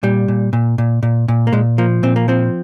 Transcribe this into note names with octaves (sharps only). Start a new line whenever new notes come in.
A#2 G3
A#2
A#2
A#2
A#2
A#2
A#3
A#2 G#3
F3 A#3
A#2 C4
A#3
F3 C4